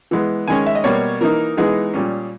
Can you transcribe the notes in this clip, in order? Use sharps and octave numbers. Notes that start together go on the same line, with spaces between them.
E3 G#3 B3
D#3 G#3 C#4 G#5
E5
D#5
B2 G3 A#3 C#5
E3 A#3 D#4 A#4
E3 G#3 B3 D#4 G#4
A#2 G3 C#4